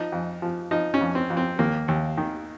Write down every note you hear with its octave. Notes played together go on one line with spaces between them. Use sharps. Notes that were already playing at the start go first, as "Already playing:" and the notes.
Already playing: F3 D#4
F2
F3
F3 D#4
C#4
F2
C4
F2
C4
D#2 A#3
D#2
D#3